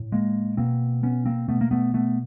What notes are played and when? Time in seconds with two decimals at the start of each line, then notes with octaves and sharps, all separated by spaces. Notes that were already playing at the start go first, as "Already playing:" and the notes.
Already playing: A2
0.12 G#3 A#3
0.57 B2 A#3 C4
1.03 B3 C#4
1.25 A#3 C4
1.48 B2 A3 B3
1.61 A#3
1.71 A3 B3
1.94 A3 B3